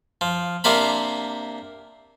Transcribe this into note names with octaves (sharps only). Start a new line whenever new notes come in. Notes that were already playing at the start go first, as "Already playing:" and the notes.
F3
C3 A#3 D4 C5 B5